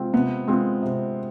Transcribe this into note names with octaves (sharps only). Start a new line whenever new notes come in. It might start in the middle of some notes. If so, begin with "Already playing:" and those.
Already playing: C3 G#3 C4 F4
C3 B3
G#3 C4 F4
C3